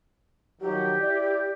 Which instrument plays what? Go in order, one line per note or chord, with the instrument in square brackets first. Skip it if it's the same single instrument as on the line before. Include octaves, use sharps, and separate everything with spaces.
[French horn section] D#3 F3 F#3 [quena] G4
[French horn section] E4 D5